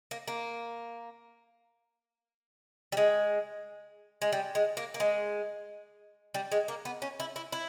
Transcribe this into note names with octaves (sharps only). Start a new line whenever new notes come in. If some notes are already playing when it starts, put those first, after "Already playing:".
A#3
A#3
G3
G#3
G#3
G3
G#3
A#3
A#3
G#3
G3
G#3
A#3
B3
C#4
E4
E4
E4